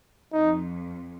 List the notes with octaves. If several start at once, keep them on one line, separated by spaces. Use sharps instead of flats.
F2 D#4